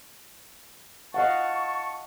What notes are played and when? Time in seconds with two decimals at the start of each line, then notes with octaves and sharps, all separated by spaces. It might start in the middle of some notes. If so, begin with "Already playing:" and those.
1.14 D#5 F5 F#5 A5 C#6